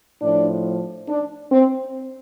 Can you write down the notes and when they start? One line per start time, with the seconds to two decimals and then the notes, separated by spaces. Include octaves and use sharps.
0.22 A2 F3 D4
1.09 D4
1.52 C4